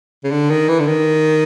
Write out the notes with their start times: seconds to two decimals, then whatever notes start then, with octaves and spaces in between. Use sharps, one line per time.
0.24 C#3
0.31 D3
0.50 D#3
0.69 E3
0.80 D3
0.87 D#3